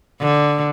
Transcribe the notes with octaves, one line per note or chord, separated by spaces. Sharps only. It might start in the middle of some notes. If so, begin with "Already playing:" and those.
D3